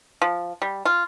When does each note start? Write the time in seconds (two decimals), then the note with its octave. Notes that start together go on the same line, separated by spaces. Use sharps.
0.22 F3
0.62 G3
0.85 F4